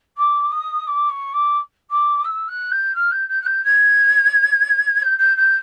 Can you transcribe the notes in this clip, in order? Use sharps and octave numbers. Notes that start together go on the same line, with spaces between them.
D6
D#6
D6
C#6
D6
D6
E6
F#6
G6
F6
G6
G6
F#6
G6
G#6
G6
G6
G6